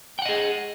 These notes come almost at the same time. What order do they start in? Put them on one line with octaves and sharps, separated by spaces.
G5 F#5 D#5 G#4